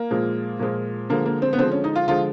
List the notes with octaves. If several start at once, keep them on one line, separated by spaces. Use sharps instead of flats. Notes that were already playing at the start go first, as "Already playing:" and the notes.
Already playing: A#3
A#2 F3 G#3
A#2 F3 G#3
D3 F3 G#3 A#3
A#3
C4
B3
D3 F3 G#3 C4
C#4
D#4
F4
D3 F3 G#3 F4